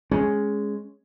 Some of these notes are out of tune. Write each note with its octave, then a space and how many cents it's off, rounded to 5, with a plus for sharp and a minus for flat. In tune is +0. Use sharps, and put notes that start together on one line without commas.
G#3 +0 C#4 +0